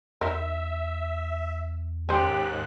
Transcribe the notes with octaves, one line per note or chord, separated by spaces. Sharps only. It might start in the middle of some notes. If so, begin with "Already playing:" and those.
E2 D#4 A#4 E5
D#2 G#2 C#4 G4 C5 G5 F#6